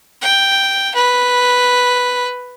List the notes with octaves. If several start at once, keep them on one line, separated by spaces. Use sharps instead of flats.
G5
B4